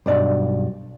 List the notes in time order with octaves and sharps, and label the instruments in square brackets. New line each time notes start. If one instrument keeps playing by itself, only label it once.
[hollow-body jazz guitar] B1 G2 D5